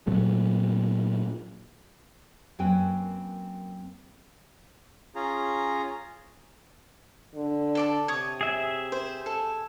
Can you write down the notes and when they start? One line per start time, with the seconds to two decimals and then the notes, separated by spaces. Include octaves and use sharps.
0.07 A#2 F#3 A3
2.59 F#2 A#3 C4 B4 G5 G#5
5.16 C#4 F4 G#4 A#5
7.35 D3
7.75 A4 D5 A5
8.08 C3 C#5 D#6
8.41 G#4 E5
8.92 C5
9.26 A4